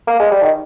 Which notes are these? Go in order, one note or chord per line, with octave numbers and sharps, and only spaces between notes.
A#3
G#3
G3
D#3